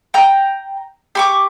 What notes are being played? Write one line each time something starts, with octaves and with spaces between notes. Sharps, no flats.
G5 A#5 G6
G4 C#6 D6